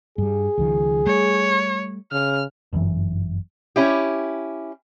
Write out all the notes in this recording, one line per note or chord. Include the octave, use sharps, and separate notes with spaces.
G2 G3 G#4
C#2 D#3 F3
G3 A3 C#5
C#3 F6
G1 F#2 C#3 E3
C#4 E4 G4